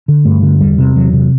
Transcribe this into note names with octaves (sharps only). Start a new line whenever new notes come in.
D3
G2 A3
D3
E2 G3
C3
E2 F#3
C3